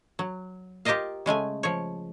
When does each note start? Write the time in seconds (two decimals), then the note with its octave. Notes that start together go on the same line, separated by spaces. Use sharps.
0.19 F#3
0.85 F4 G4 A#4 C5 D#5 F5
1.26 C#3 G#3 A3 G#5
1.63 F3 C#5